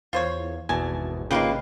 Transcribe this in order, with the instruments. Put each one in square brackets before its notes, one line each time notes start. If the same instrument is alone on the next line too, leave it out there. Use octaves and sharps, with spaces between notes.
[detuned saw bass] E2 [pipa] F4 C5 C#5
[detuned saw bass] G#1 [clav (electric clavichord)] E2 B2 A5 [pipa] G#5
[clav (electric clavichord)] C#3 [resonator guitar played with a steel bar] A#3 F4 B4 [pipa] D#4 G4